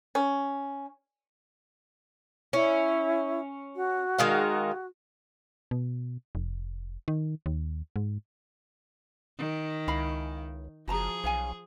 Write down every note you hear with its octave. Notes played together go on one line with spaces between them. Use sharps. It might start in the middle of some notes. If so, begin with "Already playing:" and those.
C#4
C#4 E4
F#4
D#3 G#3 F5
B2
F1
D#3
D#2
G#2
D#3
C#2 E4 F5 B5
F#1 F3 F#4 G#4 A5 A#5
B1 C#5 F5 G#5